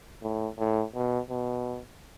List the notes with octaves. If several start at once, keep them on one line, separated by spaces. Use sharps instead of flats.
A2
A2
B2
B2